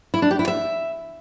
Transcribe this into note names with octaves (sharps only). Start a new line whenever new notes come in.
E4
D4
G4
E4
E5